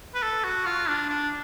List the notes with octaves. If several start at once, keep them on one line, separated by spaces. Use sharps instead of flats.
B4
A4
F#4
F4
D4
D4